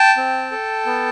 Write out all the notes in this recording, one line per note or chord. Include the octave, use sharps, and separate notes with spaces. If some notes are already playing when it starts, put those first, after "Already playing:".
Already playing: G5 A5
C4
A4
B3